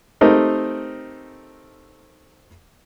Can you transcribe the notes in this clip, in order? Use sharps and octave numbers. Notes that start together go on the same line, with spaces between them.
A3 C4 D#4 G4 A#4